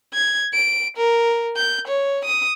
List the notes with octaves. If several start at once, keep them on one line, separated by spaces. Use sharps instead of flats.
G#6
D7
A#4
G6
C#5
D#6